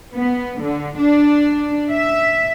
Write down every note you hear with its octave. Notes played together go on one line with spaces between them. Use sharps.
B3
D3
D4
E5